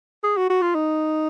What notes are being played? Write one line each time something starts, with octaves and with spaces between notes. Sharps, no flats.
G#4
F#4
F#4
F4
D#4